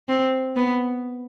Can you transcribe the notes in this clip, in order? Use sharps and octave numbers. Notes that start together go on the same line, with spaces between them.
C4
B3